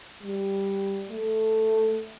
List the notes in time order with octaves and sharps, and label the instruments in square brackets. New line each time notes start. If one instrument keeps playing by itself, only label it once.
[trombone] G3
A3